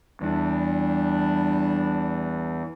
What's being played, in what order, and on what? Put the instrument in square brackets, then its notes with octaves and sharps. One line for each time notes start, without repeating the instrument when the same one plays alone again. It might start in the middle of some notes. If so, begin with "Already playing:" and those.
[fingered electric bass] E2 [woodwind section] G3 D4